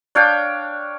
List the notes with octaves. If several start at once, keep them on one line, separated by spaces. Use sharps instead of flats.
D4 C#5 F5 G5